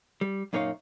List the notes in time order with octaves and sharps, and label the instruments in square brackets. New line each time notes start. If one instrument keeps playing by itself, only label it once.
[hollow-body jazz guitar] G3
F#2 A#2 A#3 D#4 C#5 F5